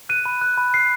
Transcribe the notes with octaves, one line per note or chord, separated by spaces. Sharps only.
F#6 D#7
B5
F#6
B5
F#6 C7